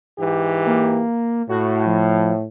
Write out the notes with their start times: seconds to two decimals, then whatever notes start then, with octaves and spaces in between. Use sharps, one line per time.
0.19 G#2 E3 G4
0.66 A#3
1.49 A2 F#4
1.86 F3